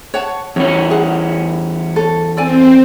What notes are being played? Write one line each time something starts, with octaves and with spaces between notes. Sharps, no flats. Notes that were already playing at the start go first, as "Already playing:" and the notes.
C#5 F#5 A5
E2 C#4 C#5
G#4 F#5
A4 C#5
C4 A4 D5 G#5